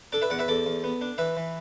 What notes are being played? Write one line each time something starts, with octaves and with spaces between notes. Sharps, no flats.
D4 A4 D5
B4 E5
E2 D5 F#5
B4 E5
E2 A4 D5
E2
B3
D4
E3 B4 E5
E3